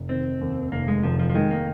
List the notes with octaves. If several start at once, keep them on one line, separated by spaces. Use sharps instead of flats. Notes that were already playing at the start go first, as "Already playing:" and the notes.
Already playing: F1
D#3 C4
D#2
F1 A#3
G#3
F1 F3
F3
F3
D#3 G#3
A#3